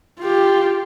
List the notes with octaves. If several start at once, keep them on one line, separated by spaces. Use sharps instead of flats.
F4 G4